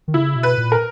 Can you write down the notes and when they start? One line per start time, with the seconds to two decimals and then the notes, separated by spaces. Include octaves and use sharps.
0.08 D#3
0.14 C#3 E4
0.36 B2
0.43 B4
0.58 A#2
0.72 A#4